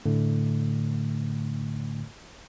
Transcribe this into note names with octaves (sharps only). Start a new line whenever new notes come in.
A2 D3 A3